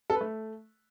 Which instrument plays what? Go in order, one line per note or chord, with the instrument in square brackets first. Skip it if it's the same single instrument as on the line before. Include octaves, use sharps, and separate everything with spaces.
[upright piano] A4
B4
A3